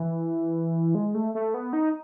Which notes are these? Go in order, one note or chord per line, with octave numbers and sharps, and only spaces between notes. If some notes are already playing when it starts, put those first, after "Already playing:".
Already playing: E3
G#3
A3
A3
B3
D#4